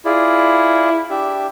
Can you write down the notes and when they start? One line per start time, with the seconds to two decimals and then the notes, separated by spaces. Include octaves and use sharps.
0.05 E4 F4 G#4 D5
1.10 D4 G4 E5